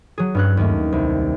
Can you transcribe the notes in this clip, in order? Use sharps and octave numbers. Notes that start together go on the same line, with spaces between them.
F#3 G#4
G2 C#4 F#6
D#2 A3
C2